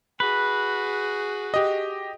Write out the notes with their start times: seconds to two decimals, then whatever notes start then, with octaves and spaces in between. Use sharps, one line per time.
0.20 F#4 G#4 B4
1.54 G4 D#5